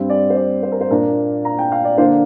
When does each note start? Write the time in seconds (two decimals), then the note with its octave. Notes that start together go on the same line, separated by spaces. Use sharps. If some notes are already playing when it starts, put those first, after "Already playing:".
Already playing: G2 G3 C4
0.10 D5
0.30 C5
0.36 D5
0.63 C5
0.72 A#4
0.81 C5
0.90 A#2 A#3 D4 A#4
1.45 A#5
1.59 G5
1.72 F5
1.85 D5
1.98 D3 A#3 D4 C5